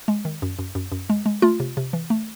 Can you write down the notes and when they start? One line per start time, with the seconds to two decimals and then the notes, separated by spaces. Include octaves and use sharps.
0.08 G#3
0.25 D#3
0.42 F#2
0.59 F#2
0.75 F#2
0.92 F#2
1.10 G#3
1.26 G#3
1.42 A3 F4
1.60 C3
1.77 C3
1.93 E3
2.10 A3